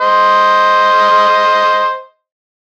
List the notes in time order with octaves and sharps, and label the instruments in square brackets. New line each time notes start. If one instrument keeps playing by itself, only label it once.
[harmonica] C5 D#5